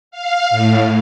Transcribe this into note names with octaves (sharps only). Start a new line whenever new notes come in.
F5
A2